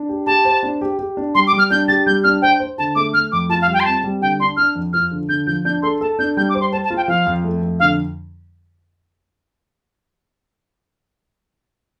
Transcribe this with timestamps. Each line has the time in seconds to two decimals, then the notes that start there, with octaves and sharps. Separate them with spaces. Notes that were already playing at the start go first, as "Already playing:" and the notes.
Already playing: D4
0.09 G4
0.26 G4 A5
0.45 C5
0.63 D4
0.81 G4
0.99 G4
1.17 D4
1.35 G3 C6
1.47 D6
1.53 G3
1.58 F6
1.70 D4 G6
1.88 G4 A6
2.06 G3 G6
2.24 D4 F6
2.42 C5 G5
2.60 C5
2.78 D3 A5
2.95 A3 D6
3.14 A3 F6
3.32 F2 D6
3.49 F4 A5
3.62 F5
3.68 G3
3.74 G5
3.80 C6
3.85 C4 A5
4.04 G3
4.21 D3 G5
4.40 D4 C6
4.57 D4 F6
4.75 F2
4.93 F3 F6
5.11 D3
5.29 D3 G6
5.47 F3 G6
5.65 D4 G6
5.82 A4 C6
6.01 A4 A5
6.19 D4 G6
6.37 G3 G6
6.49 D6
6.55 C5
6.61 C6
6.72 C5 A5
6.85 A5
6.90 F4
6.97 G5
7.08 F3 F5
7.26 F2
7.44 A3
7.62 F2
7.80 D3 F5